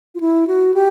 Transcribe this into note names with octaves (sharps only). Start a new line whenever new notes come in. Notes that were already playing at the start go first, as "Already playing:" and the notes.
F4
E4
F#4
G4